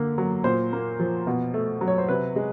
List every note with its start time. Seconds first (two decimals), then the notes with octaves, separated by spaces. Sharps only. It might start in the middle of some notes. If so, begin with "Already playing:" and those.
Already playing: D3 A#3
0.18 F#3
0.44 A#2 C5
0.73 A#3
1.00 F3
1.27 B2
1.54 A3
1.81 F#3
1.88 C#5
1.98 C5
2.08 C3 B4
2.36 G#3